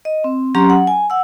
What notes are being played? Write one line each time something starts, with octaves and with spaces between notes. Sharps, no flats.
D#5
C4
F#3 C#4 G4 A#5 C6
F#5
G#5
F#5 E6